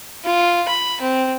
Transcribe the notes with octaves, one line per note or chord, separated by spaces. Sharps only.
F4
B5
C4